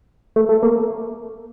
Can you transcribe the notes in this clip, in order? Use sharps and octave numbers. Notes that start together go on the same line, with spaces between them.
A3
A3
A#3